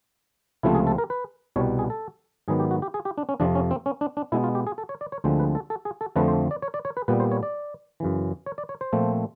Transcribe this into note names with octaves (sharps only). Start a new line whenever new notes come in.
C#2 C3 F3 A3 C4 E4
G#4
A4
A#4
B4
C2 B2 G3 C#5
G#4
A4
G#2 D#3 F#3 B3 G#4
G4
F#4
G4
G#4
G4
D4
C#4
F2 C3 F3 D4
C#4
C4
C#4
D4
D4
B2 G#3 B3 E4
F4
G4
G#4
A4
C#5
D5
C#5
D2 D3 F3 G#3 C4 C5
B4
A4
A4
G#4
A4
F2 D3 F3 A3 C4 B4
C5
D5
C#5
D5
C#5
B4
A#2 G3 B3 B4
C5
C#5
D5
F#2 C#3 E3
C#5
D5
C#5
C5
A#2 F3 A3 C4